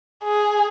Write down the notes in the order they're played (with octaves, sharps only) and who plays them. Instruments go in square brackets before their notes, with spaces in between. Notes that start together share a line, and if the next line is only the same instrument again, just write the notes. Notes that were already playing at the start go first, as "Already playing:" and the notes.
[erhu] G#4